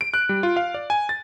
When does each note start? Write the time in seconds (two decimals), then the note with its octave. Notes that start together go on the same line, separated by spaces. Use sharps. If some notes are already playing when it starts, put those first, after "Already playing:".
0.01 D7
0.14 F#6
0.29 G3
0.43 F4
0.57 F5
0.74 D5
0.90 G#5
1.09 A6